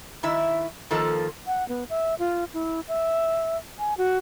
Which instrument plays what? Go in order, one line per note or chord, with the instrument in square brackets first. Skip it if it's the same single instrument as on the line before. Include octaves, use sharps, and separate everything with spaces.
[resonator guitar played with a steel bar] D#3 E4 E5
D#3 F3 A#3 A4
[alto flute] F#5
B3
E5
F4
E4
E5
G#5
F#4